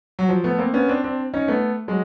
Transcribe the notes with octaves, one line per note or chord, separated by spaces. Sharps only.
F#3
F3
A3 B3
A#3 C4
B3 C#4
C4 D4
C4 D4
C#4 D#4
A3 B3
F#3 G#3